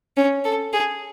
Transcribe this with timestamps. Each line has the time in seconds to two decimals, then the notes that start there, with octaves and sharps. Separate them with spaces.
0.17 C#4
0.45 A4
0.73 G#4